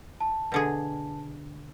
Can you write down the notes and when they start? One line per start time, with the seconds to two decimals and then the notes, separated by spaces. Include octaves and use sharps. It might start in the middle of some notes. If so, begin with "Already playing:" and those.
0.21 A5
0.52 B2 D3 G#4